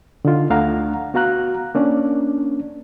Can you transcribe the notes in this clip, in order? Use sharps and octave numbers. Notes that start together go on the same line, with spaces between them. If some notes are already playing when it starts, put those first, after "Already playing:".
D3 D#4 F4
D2 A3 D4 F5 F#5 A#5
B3 F#4 F5 A#5 F#6
A#3 C#4 D4 D5